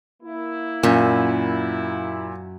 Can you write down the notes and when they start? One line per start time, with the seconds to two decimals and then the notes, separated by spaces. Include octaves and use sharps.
0.22 A#3 E4
0.83 F#2 A#2